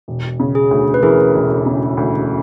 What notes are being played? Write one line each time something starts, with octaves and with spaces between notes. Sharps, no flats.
E1
C#3
G#4
D2
B4
E3 G#4 A#4
E1
C#3
D2